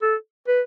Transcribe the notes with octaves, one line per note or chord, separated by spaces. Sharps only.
A4
B4